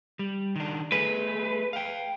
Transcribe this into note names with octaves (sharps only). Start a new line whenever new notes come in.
G3
D#3 D4
A3 G#4 B4
F5 G5